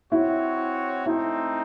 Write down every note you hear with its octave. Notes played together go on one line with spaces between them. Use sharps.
C4 E4 F#4 C#5
A3 C4 D#4 E4